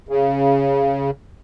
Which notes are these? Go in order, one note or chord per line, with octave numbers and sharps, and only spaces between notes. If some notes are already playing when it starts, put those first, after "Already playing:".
C#3